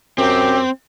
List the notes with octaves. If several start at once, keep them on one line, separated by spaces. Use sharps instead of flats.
F#2 C4 G4